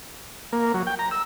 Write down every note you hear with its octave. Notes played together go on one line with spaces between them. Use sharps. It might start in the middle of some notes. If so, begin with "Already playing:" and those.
A#3
F#3
G5
A#5
E6